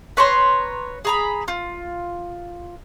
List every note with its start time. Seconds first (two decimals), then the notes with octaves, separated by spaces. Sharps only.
0.17 B4 C#5 A#5 C6
1.05 G#4 A#5 B5
1.48 F4